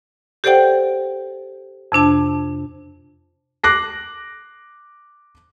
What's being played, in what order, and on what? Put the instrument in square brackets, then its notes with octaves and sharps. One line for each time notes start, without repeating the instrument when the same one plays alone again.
[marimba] G4 A4 C5 D5 F#5 G5
F2 C3 D4 A5
[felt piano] D6 F#6 A#6 C7